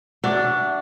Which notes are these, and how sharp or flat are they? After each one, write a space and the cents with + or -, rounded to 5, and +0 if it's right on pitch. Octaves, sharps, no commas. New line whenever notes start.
D4 +0 F#4 +15 E5 +30